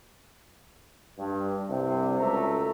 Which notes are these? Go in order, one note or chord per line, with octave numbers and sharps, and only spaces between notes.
G2
C2 G2 C3
C#2 F#2 A3 E5 A#5